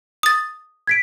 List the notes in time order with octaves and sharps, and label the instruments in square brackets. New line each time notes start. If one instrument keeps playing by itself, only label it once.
[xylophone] D#6 A6
[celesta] G#6 B6 D7